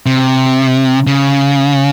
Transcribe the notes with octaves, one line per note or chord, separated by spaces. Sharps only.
C3
C#3